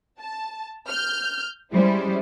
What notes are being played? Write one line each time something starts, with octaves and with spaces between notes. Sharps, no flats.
A5
F6 G6
G3 G#3 C#4 E4 C5